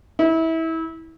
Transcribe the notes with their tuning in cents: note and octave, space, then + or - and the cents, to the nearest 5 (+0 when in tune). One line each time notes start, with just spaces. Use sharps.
E4 -25